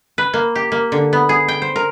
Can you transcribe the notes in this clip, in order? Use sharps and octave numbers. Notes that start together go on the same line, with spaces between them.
B4
A#3
G4
A#3
D3
B3
G#4
G5
C5
A#4